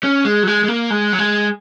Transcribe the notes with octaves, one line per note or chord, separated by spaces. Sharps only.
C#4
G#3
F#3
G#3
G#3
A#3
G#3
F#3
G#3